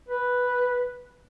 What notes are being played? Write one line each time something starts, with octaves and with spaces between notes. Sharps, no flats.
B4